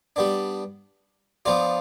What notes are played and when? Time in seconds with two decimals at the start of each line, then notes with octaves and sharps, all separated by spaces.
0.16 G3 B3 D4
1.45 F3 B3 D4 F4